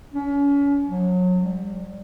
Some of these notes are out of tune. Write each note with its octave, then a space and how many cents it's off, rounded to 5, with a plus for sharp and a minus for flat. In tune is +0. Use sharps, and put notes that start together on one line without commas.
C#4 +35
F#3 -30
G3 +15